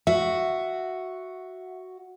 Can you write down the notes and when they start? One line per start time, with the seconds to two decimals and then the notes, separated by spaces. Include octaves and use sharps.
0.07 F#4 E5